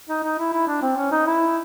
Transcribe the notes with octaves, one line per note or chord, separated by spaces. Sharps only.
D#4
D#4
E4
E4
D4
C4
C#4
D#4
E4